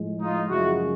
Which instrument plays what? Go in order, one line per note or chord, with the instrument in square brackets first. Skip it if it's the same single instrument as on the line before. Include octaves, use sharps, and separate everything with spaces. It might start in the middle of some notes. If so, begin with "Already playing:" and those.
Already playing: [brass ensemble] A2 F3 G#3
D#4 F4
F#2 C#3 F3 G#3 E4 F#4